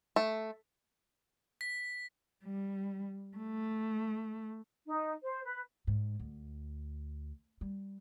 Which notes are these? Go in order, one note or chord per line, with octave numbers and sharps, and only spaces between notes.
A3
B6
G3
A3
D#4
C5
B4
G#2
D2
G3